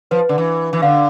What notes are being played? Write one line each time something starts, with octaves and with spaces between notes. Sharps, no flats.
F3 B4
D3
E3
E3
D3 F5